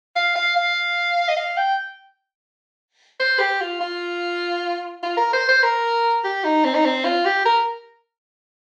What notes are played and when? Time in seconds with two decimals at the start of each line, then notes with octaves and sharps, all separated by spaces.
0.16 F5
0.36 F5
0.56 F5
1.28 D#5
1.36 F5
1.57 G5
3.20 C5
3.39 G4
3.61 F4
3.80 F4
5.03 F4
5.17 A#4
5.33 C5
5.49 C5
5.63 A#4
6.24 G4
6.44 D#4
6.65 C4
6.75 D#4
6.85 C4
7.05 F4
7.25 G4
7.45 A#4